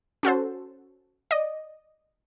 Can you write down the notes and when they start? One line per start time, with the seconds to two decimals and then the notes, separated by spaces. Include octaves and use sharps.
0.23 C#4 F#4 A4 C5
1.31 D5 D#5